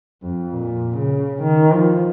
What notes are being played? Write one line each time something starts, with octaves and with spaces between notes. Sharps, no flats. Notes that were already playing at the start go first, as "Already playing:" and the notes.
F2
A#2
C#3
D#3
F3